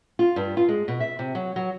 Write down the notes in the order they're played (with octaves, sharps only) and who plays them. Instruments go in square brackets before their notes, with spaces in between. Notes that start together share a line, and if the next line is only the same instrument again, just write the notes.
[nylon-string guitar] F4
G2
F4
G#3
B2
E5
C3
F#3
F#3